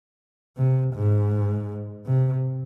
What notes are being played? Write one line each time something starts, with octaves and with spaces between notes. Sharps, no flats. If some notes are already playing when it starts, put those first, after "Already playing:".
C3
G#2
C3